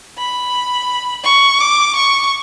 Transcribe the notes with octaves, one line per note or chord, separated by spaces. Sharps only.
B5
C#6
D6
C#6